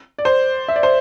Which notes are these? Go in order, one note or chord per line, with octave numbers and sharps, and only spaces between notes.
D5
C5
E5
D5
C5